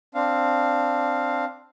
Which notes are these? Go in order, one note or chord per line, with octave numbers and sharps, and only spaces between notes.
C4 D4 F5